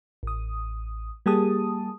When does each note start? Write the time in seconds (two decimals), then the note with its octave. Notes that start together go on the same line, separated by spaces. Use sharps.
0.23 A1 D#6
1.26 G3 A#3 G4 G#4 A5 D#6